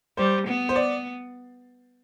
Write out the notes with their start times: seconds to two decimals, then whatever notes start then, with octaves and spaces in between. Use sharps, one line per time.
0.17 G3 C5
0.47 B3
0.69 C5
0.76 D5